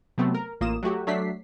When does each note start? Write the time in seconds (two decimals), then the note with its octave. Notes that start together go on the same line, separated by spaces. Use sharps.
0.18 C3 F#3 A3 B3 C4
0.35 A#4
0.61 A1 A#3 F4 D#6 E7
0.83 F#3 A3 F#4 G4
1.07 F#3 A3 D4 B6 C7